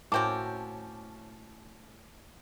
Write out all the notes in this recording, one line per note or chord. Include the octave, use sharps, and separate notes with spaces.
A2 A#3 C4 C#4 F#4 A5 D6 G6